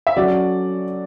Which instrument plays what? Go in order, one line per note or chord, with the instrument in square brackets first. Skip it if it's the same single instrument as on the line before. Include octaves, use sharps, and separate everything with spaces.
[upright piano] E5
[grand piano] F#3 C#4 F#4 A4 [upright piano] D5